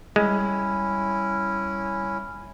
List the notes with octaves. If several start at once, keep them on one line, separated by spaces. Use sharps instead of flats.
G3 G#3 C#4 E4